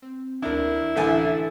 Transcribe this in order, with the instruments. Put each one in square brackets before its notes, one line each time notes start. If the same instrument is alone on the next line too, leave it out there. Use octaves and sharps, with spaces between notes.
[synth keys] C4
[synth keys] D2 D#3 [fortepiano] D4 A#4 [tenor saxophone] E4
[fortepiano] A1 D3 G#5 [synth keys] D2 A4 A6